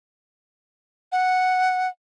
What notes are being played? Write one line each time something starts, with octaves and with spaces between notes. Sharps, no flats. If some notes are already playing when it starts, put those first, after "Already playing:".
F#5